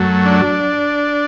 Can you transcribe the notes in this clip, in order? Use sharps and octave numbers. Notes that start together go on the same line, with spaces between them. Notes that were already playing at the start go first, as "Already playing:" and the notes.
Already playing: F#2 F#3 A3
D4